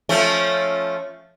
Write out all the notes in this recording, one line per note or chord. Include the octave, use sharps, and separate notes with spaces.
F3 A3 C#4